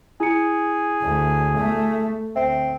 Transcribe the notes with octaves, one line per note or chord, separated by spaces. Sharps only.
E4 G#4 C#7
D2
A3
D2 C4 E5